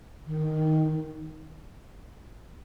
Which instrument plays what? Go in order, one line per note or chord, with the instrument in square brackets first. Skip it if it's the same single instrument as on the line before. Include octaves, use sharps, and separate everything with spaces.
[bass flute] D#3